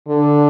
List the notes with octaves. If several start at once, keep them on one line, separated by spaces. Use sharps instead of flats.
D3